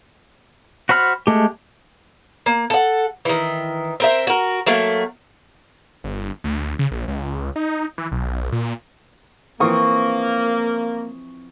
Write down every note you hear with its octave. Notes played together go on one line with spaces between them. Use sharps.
F#4 C5 B5 F6
G#3 A3 G4
A#3
A4 F#5
D#3 E3
C4 A#4 E5
F#4 A#4
F#3 A3 A#3
G1
D2
C#3
A#1
C#2
D#4
E3
B1
A#2
E3 F3 A#3 C4 C#6 D#6